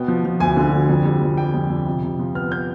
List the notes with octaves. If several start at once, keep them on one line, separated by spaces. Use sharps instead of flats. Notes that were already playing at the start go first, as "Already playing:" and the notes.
Already playing: B2 B3 G5
F3
F3
D2 G#5
D3
D3
F2
G3
F2
G3 G5
F2
F2
C3
C3
F3
B3 F6
B3 G6